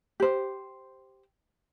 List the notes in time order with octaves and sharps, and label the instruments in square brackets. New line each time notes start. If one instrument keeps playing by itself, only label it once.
[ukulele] G4 C5